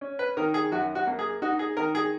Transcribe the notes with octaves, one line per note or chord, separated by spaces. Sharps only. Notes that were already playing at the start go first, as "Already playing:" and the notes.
C#4
B4
D#3 A#4
G#4
F#2 F#4
F#4
A#3
G#4
D#4 F#4
G#4
D#3 A#4
G#4